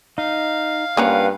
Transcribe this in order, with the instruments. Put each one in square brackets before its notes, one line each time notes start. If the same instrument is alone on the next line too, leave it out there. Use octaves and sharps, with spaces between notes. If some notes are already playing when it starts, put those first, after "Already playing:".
[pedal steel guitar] D#4 [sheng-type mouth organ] F5
[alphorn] G2 [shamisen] A#3 C#4 F4 [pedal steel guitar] B4 F#5